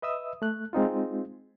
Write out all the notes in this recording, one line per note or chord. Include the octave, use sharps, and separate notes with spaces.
B4 D#5 E5 D#6 E6
A3 F#6
G#3 C4 D#4 F4